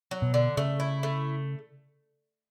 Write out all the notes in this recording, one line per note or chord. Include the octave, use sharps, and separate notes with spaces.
F#3
B2
D3
C#3 A3
E4
A3